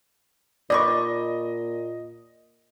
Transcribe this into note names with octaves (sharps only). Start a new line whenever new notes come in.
A#2 D#4 B4 D5 D#5 C#6